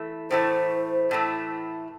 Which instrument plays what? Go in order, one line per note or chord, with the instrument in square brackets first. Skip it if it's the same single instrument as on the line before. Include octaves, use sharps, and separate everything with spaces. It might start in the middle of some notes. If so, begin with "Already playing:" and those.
Already playing: [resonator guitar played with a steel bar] E3 A3
[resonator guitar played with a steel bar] A2 E3 A3 [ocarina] C5
[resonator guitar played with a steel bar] A2 E3 A3